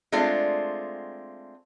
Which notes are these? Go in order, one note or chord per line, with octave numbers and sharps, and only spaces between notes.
G#3 A3 C4 D4 F4